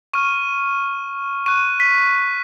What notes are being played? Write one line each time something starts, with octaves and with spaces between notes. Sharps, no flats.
C#6 F6 D#7
C#6 F#6 D#7
B6